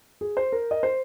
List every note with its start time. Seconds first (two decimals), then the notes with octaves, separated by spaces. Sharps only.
0.21 G#4
0.37 C5
0.52 A#4
0.71 D#5
0.83 C5